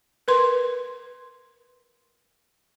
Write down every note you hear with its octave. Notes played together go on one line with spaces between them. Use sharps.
A#4 B4 C6